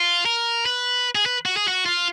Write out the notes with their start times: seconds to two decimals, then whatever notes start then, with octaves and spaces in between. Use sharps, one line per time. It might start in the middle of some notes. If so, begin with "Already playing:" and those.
Already playing: F4
0.26 A#4
0.66 B4
1.15 G#4
1.26 B4
1.46 F#4
1.57 G#4
1.68 F#4
1.86 F4